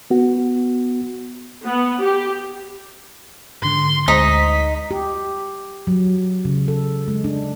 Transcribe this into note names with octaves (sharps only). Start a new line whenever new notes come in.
B3 F#4
B3
G4
G#2 D3 C6
D2 G#3 D#4 C5 B6
G4
F#3
C#3
A4
G#3
D4